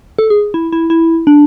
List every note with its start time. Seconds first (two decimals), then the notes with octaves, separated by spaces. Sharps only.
0.19 A4
0.30 G#4
0.54 E4
0.73 E4
0.90 E4
1.27 D4